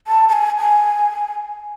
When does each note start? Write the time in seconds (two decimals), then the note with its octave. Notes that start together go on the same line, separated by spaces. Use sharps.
0.07 A5
0.29 A5
0.33 G#5
0.59 G#5